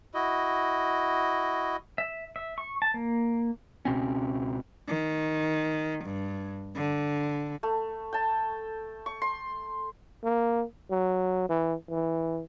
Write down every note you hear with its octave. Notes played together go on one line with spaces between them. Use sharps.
E4 F#4 D#5
E5
E5
C#6
A5
A#3
C#2 B2 C4 C#4
D#3
G2
D3
A3
G5 A5
C#6
C6
A#3
F#3
E3
E3